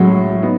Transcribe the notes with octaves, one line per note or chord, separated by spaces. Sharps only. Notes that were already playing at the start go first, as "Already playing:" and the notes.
Already playing: A2 F#3 G#3 C#4 E4
B3 D#4